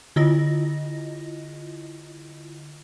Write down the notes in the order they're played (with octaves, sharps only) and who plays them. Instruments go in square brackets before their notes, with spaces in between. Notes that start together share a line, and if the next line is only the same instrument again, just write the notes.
[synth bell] D3 E4 F4 D#5 A#6